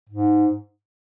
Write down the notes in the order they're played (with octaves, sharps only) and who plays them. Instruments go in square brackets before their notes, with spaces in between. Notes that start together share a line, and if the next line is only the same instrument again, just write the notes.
[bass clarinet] G#2